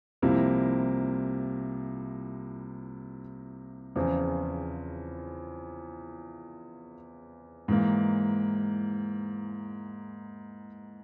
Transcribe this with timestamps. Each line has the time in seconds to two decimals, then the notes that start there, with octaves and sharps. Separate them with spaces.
0.22 C2 C3 F3 A#3 E4
3.96 E2 C#3 F3 C4 F4
7.68 G#2 E3 A#3